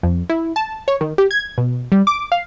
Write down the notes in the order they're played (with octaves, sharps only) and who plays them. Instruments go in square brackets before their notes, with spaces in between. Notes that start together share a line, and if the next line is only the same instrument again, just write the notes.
[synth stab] F2
E4
A5
C#5
D#3
G4
G#6
B2
G3
D6
F5